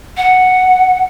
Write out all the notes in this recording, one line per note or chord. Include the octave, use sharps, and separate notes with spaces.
F#5